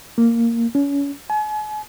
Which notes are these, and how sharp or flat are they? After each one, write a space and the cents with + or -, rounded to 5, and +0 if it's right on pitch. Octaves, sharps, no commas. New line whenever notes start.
A#3 -10
C#4 +30
G#5 +40